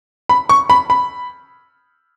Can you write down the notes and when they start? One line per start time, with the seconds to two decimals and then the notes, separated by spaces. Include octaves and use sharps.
0.29 B5
0.49 C#6
0.70 B5
0.90 B5